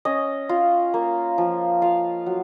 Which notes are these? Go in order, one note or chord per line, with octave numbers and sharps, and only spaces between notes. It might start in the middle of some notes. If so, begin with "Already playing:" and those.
C#4 D#5
F4
A#3
F3
F4 F5
F#3